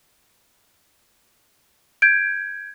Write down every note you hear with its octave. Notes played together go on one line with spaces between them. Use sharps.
G6 G#6 D7